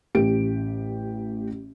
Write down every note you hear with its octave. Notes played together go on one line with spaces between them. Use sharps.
A1 A2 G4 D7